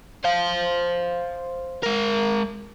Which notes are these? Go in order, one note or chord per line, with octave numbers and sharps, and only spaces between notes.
C5 F5
G#3 A#4